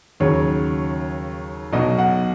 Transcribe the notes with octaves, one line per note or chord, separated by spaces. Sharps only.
D#2 C#3 F#3 C#5
B1 B2 F#3 D#5
F#5